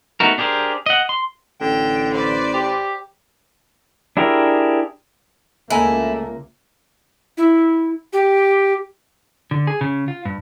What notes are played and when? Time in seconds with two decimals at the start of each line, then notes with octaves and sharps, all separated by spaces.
0.20 A3 B3 D#4 F#4 A#4
0.38 D4 G4 G#4 A#4 C5
0.86 D#5 F#5
1.09 C6
1.61 A1 D3 G5
2.12 B4 C5 D5
2.54 G4
4.17 D4 E4 G4 G#4 A#4
5.70 C#2 A3 A#3 E4 D#5 G#5 A#5
7.38 E4
8.13 G4
9.51 D3
9.67 G#4
9.81 C#3
10.08 F4
10.25 G2